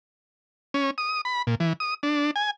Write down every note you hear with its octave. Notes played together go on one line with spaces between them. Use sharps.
C#4
D#6
B5
A#2
E3
D#6
D4
G#5